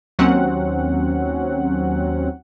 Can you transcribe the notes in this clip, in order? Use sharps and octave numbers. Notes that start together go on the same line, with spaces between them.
D#2 F#3 C4 C#4 F#5